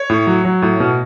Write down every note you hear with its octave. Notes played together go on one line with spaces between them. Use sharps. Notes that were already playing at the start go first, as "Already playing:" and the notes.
Already playing: C#5
A2
F#3
F#3
A2
B2